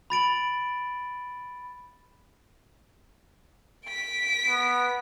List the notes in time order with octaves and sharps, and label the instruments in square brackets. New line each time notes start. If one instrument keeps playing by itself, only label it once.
[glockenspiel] B5 A6 D7 F#7
[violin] B6 D7
[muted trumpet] B3